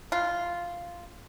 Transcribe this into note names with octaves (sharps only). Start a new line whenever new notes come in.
F4